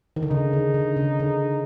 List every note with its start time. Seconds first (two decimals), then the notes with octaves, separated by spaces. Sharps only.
0.16 D#3
0.23 D3
0.30 C#3 D#4
0.53 D3
0.74 D3
0.97 C#3
1.20 D3